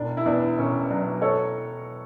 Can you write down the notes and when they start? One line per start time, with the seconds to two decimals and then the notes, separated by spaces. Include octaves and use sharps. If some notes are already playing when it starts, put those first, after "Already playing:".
Already playing: E1 D4
0.17 E4
0.25 E2 D4
0.58 E1 C#4
0.90 F#3 D4
1.22 A4 C#5